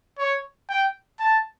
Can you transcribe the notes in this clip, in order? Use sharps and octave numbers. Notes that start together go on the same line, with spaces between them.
C#5
G5
A5